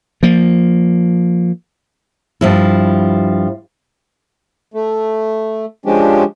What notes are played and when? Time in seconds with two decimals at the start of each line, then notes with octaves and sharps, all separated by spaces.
0.23 F3 A#3
2.41 G2 F3 E4
4.74 A3
5.86 F3 G#3 C#4 D4 G4